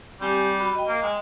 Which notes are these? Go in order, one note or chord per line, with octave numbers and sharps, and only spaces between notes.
G3 C4 G4 G#5
F#4 B5
D#5 G5
A#3
G#3